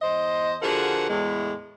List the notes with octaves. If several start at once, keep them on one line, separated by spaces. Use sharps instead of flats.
E2 C5 D#5
D3 F3 F#4 G#4 A#4 F#5
E2 A2 G#3